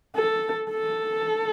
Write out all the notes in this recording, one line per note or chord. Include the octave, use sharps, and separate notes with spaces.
A4
A4